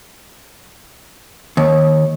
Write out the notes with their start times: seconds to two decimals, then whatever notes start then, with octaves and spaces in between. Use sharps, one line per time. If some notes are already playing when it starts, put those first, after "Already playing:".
1.57 D#2